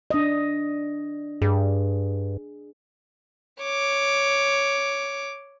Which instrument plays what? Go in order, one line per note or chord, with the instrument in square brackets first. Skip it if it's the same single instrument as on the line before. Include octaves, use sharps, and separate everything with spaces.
[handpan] D4 D#5
[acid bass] G2 [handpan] G#4
[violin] C#5 D6